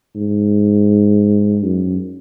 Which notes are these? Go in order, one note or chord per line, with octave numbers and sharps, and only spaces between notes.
G#2
F#2